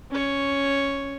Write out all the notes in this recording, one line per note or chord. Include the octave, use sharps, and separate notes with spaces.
C#4 C#5